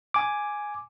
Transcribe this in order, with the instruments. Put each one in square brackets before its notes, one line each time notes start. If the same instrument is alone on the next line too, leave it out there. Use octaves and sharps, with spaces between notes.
[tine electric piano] G#5 D6